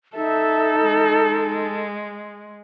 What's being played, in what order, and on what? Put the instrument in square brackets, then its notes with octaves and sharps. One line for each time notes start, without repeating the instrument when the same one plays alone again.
[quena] D#4 [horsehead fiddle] A4 [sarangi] E5
[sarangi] G#3